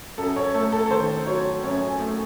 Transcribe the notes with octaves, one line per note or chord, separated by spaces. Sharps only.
F#2 A4
C#5
A3 A4
A4
A4
D#3 C5
F#3 C#5
F#2 C#5
G#5
A3